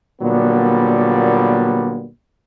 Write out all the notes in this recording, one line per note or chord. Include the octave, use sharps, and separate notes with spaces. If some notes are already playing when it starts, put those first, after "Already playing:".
A#2 D3 F#3 G3 A#3 B3